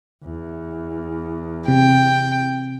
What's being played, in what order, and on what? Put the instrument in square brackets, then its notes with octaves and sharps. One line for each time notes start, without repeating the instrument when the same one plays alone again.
[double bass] E2
[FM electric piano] C3 [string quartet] G5